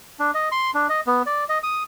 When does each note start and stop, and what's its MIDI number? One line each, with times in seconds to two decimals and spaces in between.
0.19 0.31 62
0.34 0.49 75
0.52 0.71 84
0.74 0.87 62
0.89 1.00 75
1.07 1.22 59
1.26 1.44 74
1.49 1.58 75
1.63 1.83 87